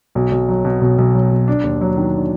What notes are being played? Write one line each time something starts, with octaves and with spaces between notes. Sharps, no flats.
B1
B1
F#3
B2
B1
B1
F#3
B2
D4
D#2
F#3
D#3
D4